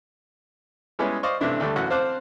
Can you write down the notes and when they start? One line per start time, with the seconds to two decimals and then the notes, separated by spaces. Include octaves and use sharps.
0.99 G3 G#3 B3 C#4 E4 G#4
1.23 C5 D5 D#5 F5 C#6
1.41 G2 C3 E3 A3 D4 E4
1.61 D2 G3 A3
1.76 A1 F#2 F#4 F#5
1.90 C4 C5 F5 A5 D6 F#6